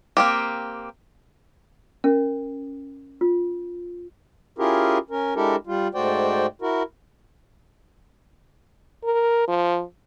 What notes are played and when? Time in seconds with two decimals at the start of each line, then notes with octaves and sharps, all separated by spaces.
0.17 A#3 C4 G4
2.04 C#4 A#4
3.21 F4
4.59 C#4 E4 F4 G4 G#4 A#4
5.10 C#4 A#4
5.36 G#3 D4 E4 G4 A4 A#4
5.67 G3 F4
5.95 G#2 A3 F#4 C5 D5 G5
6.61 E4 F#4 A#4
9.04 A#4
9.47 F3